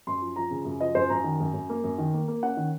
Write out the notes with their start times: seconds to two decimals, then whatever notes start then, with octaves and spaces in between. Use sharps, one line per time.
0.07 F#2 C6
0.22 F3
0.36 F3 A#5
0.51 C#3
0.65 F#2
0.81 F3 D#5
0.95 F#2 C5
1.10 F#2 A#5
1.24 D#3
1.40 F#2
1.54 F#2
1.70 A#3
1.84 F#2
1.98 D#3
2.14 A#3
2.28 A#3
2.43 C#4 F#5
2.57 D#3